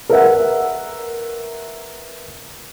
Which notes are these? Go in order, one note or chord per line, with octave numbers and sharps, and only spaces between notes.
A#4 B4 E5 F#5